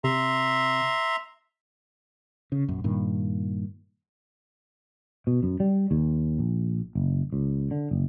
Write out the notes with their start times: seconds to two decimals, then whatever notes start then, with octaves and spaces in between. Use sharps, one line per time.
0.04 C3 E5 A#5 C6
2.52 C#3
2.68 A#1 F#2
2.84 G2 A#2 D#3
5.27 B2
5.43 F#2
5.60 G3
5.91 D#2
6.39 A#1
6.95 F#1
7.33 C#2
7.71 D3
7.91 F#1